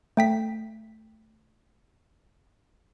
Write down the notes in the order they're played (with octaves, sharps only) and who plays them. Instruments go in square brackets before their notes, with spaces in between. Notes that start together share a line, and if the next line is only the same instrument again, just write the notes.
[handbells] A3 G5 B6